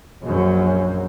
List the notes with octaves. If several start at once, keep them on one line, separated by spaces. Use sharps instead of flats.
A#1 F#2